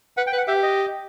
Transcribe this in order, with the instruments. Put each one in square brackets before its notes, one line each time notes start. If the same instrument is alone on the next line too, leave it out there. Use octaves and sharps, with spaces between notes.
[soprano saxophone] B4 [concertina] F#5
[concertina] G5
[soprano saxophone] B4
[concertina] F#5
[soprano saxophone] G4 [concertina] E5
[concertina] D#5